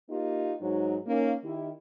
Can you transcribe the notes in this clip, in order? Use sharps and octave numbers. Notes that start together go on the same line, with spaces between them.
A#3 D#4 F4 G4
G#2 F#3 D#4
A#3 C#4 D#4
D#3 E4 G4